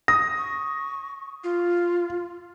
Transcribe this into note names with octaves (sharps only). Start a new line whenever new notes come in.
D#6 A#6
C#6
F4